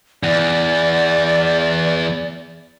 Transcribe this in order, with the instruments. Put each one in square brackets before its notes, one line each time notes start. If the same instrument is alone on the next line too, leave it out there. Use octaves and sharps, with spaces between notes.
[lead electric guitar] E2 [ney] D5